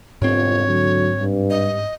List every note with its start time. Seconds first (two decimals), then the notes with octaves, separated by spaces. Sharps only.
0.22 G1 C2 F2 G#2 C4 C#5
0.68 D3 F#3
1.18 G2
1.50 D#5